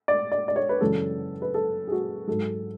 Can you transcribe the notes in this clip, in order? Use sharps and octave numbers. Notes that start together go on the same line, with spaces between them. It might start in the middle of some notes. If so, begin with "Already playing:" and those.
D5
D5
D5
C#5
B4
F#2 C#3 E3 G#3 A4
B4
A4
G#4
F#4
G#2 F#3 A4